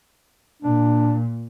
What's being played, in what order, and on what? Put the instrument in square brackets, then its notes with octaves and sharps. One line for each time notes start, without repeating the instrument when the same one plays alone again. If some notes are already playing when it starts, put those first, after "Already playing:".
[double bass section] A#2 [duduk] D4